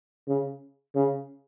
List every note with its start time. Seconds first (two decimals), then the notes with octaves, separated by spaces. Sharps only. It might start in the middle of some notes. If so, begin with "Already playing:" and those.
0.27 C#3
0.95 C#3